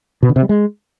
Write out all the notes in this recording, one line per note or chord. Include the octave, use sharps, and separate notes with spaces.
B2
D3
C3
G3
G#3